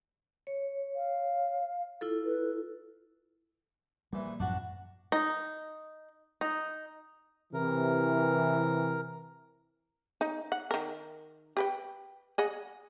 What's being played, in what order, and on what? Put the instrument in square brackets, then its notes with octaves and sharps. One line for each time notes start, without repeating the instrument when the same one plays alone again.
[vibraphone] C#5
[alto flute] F5
[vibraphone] E4 F4 A4
[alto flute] B4
[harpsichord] A#1 E3 [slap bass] G3
[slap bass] F#2 A2 F3 [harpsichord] D4 F#4
[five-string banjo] D#4
D#4
[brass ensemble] C3 E3 [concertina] A#4
[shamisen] D#4
F#5
D#3 A#4
G4 B4 G5
G#4 D#5 F#5